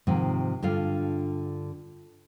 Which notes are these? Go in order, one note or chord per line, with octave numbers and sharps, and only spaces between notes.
G#2 C3 D#3 F3
G2 D3 F4 F5